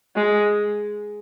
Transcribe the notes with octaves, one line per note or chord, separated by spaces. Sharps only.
G#3